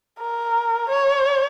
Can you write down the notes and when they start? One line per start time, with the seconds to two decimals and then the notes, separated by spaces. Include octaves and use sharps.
0.20 A#4
0.89 C#5